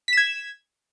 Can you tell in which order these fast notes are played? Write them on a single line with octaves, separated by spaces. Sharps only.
B6 E7 G#6